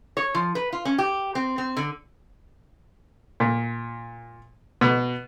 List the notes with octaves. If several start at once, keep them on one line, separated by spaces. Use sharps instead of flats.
C#5
F3
B4
F4
C#4
G4
C4
C4
D3
A#2
B2